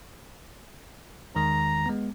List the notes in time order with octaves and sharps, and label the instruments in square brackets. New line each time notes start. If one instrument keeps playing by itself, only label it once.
[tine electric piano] E2 D#3 G#3 [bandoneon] A#5
[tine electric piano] G#3 B3